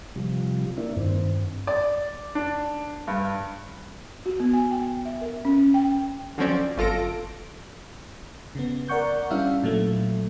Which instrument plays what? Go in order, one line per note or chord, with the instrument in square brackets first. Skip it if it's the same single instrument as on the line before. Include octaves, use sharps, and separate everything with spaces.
[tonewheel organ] C3 F3 G3
A#3 D4 E4
[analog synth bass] G2 [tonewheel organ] D#3 C4
[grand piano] D5
D4
G2
[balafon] F#4
B3
G#5
G5
E5
A#4
C#4
G5
[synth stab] D3 F3 F#3 C4 C#4 D5
G1 F#2 F4 A4 A#6 D7
[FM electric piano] C#3 B3
A#4 D5 F#5 C#6 G6
G3 C#4 D4 E4 E5 F5
A#2 F#3 A3